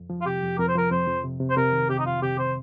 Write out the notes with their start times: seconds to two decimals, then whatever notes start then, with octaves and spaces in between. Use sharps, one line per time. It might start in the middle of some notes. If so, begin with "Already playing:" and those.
Already playing: F2
0.10 F3
0.21 F4
0.26 C3 G4
0.43 F2
0.59 F2 A#4
0.68 C5
0.75 F3 A#4
0.91 F2 C5
1.08 F2
1.24 C3
1.40 C3
1.50 C5
1.57 C3 A#4
1.73 D#3
1.90 C3 G4
1.99 D#4
2.05 F2 F4
2.22 C3 G4
2.39 C3 C5